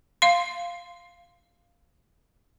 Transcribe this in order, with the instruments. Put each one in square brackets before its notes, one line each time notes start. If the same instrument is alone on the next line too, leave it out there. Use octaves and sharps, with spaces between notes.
[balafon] F5 C6